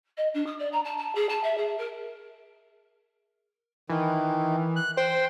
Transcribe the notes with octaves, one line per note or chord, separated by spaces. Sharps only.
D#5
D4
D#6
D5
A#5
A5
A5
G#4
A5
E5
G#4
A#4
D#3 E3
F#6
C5 G5 C6